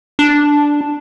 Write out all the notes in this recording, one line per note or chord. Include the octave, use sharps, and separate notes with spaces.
D4